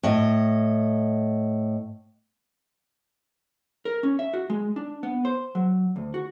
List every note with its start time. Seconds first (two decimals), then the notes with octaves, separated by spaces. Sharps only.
0.03 A2 D#5
3.85 A#4
4.03 C#4
4.19 E5
4.34 F#4
4.50 G#3
4.76 D4
5.03 B3
5.25 C5
5.55 F#3
5.96 D2
6.14 F#4